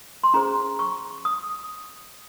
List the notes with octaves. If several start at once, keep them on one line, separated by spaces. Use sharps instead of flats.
C6
C#4 G#4 C5 A#5
C#6
D#6